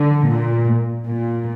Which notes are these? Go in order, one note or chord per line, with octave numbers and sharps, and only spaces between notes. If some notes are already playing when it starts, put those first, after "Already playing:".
Already playing: D3
A#2
A#2